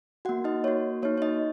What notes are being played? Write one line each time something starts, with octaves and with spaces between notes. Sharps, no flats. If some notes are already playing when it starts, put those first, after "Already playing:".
A#3 F#4 F#5
D#4 D#5
A#3 F#4 C#5
A#3 D#4 F#4 C#5
C#5
D#4 D#5